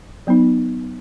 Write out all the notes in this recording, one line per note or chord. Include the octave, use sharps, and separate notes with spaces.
F#3 B3 D#4